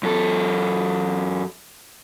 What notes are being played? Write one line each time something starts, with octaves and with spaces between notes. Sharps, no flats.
F#2 A4